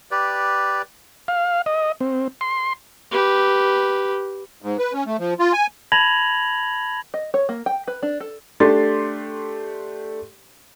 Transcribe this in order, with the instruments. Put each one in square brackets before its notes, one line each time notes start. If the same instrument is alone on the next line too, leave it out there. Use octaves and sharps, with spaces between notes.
[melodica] G4 B4 D5
[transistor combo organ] F5
D#5
C4
C6
[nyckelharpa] G4 B4
[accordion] G#2
B4
C#4
A3
F3
F4
G#5
[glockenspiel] A5 B5 G#6 A#6 F7 F#7
[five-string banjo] D#5
C#5
A#3
G5
B4
D4
A4
[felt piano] A3 D4 G4 C6 A6